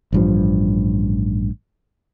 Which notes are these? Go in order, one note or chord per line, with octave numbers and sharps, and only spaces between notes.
A1 G2 F3